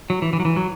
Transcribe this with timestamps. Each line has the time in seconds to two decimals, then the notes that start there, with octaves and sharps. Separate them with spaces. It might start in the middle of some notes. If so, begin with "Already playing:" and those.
0.10 F#3
0.22 E3
0.33 E3
0.40 F#3
0.45 E3
0.56 F#3